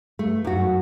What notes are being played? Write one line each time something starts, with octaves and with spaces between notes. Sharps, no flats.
A3
F#2 F#4